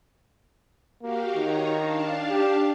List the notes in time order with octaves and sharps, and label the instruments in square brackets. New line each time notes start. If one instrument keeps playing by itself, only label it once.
[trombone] A#3 [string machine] F#4 G4 F5
[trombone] D#3 [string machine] D#4 C#5 A#5
[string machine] D4 F5 A5
[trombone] G4